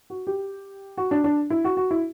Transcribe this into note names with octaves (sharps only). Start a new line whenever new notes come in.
F#4
G4
F#4
D4
D4
E4
F#4
F#4
E4